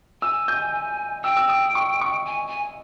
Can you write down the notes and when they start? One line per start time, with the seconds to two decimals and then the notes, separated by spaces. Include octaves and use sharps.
0.22 G#5 E6
0.48 G6
1.24 G5 E6
1.37 E6
1.49 D#6
1.75 C#6
2.01 C#6
2.26 G#5
2.49 G#5